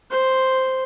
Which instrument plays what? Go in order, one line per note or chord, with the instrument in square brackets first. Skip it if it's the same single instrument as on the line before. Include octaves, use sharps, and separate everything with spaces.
[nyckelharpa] C5